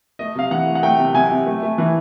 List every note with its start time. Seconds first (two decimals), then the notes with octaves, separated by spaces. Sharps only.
0.19 A3 D#5
0.35 C3 F5
0.51 E3 F#5
0.67 A3
0.75 F#5
0.83 A3 G5
0.99 C3
1.14 C3 G#5
1.31 C3
1.46 A3
1.63 A3
1.78 E3